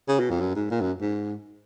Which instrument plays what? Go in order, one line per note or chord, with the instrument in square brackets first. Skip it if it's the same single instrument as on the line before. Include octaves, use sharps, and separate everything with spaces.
[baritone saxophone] C#3
B2
F2
F#2
G#2
A#2
F#2
G#2